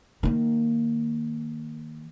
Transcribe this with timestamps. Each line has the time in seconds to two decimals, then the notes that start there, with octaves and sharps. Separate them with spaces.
0.23 D#3 A#3